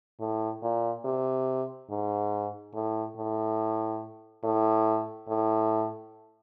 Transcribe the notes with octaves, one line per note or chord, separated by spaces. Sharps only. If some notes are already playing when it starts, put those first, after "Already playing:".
A2
A#2
C3
G#2
A2
A2
A2
A2